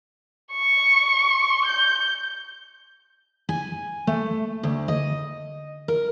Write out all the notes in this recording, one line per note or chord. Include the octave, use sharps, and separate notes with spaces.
C#6
G6
G#5
A3
D2
D#5
A#4